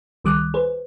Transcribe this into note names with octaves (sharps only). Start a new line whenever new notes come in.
C#2 D#3 G3 D6 D#6 F#6
G#4 B4 C5